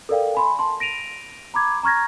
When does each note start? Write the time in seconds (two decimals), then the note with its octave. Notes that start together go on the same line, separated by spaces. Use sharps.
0.09 A4 A#4 D5 F5 G5
0.35 G#5 B5 C6
0.59 A5 C6
0.80 A#6 D7 D#7 F7
1.54 A#5 B5 D6 G#6
1.83 A#5 C#6 F6 G#6 A#6